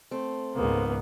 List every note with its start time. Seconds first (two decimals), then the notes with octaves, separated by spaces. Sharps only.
0.11 A3 C4
0.55 C#2 G#2 A#3 B3